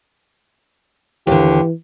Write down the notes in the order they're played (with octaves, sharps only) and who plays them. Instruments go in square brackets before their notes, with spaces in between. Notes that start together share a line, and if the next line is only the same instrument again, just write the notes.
[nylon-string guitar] D#2 D3 [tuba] E3 [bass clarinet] G4